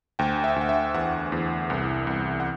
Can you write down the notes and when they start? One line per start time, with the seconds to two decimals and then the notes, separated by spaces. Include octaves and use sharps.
0.19 D2 G5
0.44 E5
0.56 D2 F#5
0.69 E5
0.94 E2 F#5
1.32 E2
1.70 C2
2.07 C2
2.40 F#5